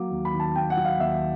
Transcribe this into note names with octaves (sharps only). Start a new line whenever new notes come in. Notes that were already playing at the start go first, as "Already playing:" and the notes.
Already playing: F#3 A#3 D6
D#2
B5
D#3
A5
A#3 G5
F#5
F#3
F5
D#2 E5